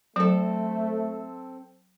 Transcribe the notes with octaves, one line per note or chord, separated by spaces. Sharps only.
F#3 A3 C4 A4